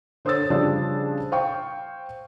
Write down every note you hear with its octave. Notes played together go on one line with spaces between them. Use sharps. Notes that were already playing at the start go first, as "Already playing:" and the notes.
D3 C5 C#5 D#6 E6 A6
C#3 F3 G3 D4 C5
C5 F5 G5 C#6